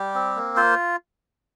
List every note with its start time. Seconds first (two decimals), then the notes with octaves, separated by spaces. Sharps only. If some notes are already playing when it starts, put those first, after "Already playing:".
Already playing: G3 G4
0.15 C4
0.36 A#3
0.57 F4 C5